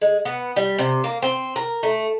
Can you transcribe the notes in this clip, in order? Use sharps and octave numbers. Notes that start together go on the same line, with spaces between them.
G#3
B3
G3
C3
A#3
C4
A#4
A3